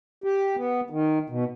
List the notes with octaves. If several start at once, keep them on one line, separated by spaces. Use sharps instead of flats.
G4
B3
D#3
B2